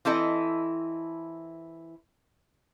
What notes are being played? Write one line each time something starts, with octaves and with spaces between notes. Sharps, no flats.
E3 C4 E4 A4 D#5